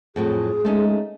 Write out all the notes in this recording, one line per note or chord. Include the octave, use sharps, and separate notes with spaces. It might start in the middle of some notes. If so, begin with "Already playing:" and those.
F2 A2 F#3 G#4
G#3 A3 C#4 D#4